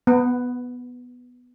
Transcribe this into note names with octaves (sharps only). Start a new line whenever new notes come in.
B3